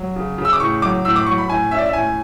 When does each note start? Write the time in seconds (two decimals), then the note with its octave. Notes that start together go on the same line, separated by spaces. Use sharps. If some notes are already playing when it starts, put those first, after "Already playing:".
Already playing: F#3
0.16 C#3
0.38 C#3
0.45 E6
0.53 D6
0.60 A2 C#6
0.82 F#3 D6
1.05 A2 E6
1.16 D6
1.26 F#3 C#6
1.38 B5
1.48 A2 G#5
1.71 C#4 E5
1.78 D5
1.86 E5
1.93 A2 G#5